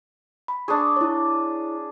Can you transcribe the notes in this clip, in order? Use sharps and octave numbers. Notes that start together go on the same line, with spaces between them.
B5
D4 G#4 C#6 D#6
E4 C#5